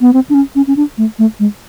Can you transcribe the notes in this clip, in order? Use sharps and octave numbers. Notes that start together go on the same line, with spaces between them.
B3
C4
D4
C#4
C#4
C#4
D4
A3
A3
G#3